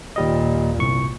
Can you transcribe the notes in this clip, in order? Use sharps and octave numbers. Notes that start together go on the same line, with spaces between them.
D#2 A#2 G3 D#5
G1 C2 C#6